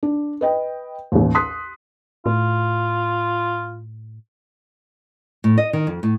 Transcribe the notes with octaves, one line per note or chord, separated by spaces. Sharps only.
D4
B4 D#5 G5
A1 D#2
C6 D#6 F#6 B6
A2 F4
A2
D#5
D#3
F2
A2